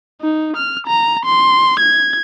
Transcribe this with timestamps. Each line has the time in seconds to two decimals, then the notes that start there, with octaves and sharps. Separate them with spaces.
0.21 D#4
0.57 F6
0.87 A#5
1.25 C6
1.80 G#6